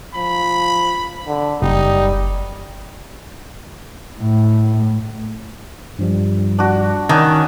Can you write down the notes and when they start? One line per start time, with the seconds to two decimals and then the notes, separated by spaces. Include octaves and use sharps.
0.15 F3 B5
1.27 D3
1.62 F#1 G3 D#4
4.20 A2
5.99 G2 F3 G3
6.59 D4 F#4
7.09 D#3 C#4 D4 F#5